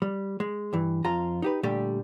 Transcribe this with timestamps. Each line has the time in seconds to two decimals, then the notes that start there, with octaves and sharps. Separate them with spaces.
0.02 G3
0.40 G#3
0.73 G2 E3
1.04 F2 F4 A#5
1.42 D#4 G4 B4
1.63 A#2 D3 G3 A3 G4